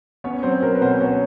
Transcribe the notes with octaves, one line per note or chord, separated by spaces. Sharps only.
B3 C#4 C#5
F#3 C4 C5
B2 A#4
B4
B2 C4 C5
B3 C#4 C#5